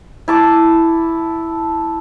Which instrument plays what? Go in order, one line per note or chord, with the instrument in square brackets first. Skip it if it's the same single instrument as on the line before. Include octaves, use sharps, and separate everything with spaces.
[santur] E4 A5 D6